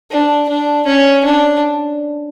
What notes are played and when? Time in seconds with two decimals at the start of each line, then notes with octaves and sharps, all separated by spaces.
0.11 D4
0.49 D4
0.86 C#4
1.25 D4